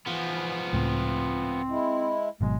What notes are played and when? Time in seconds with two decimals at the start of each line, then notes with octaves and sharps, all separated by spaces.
0.06 E3 F3 B3
0.73 C#2 A2 C4
1.69 G#3 E4
2.41 G#1 B2 F#3 G#3